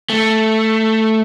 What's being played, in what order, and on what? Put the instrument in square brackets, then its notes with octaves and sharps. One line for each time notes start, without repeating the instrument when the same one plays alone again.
[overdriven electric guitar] A3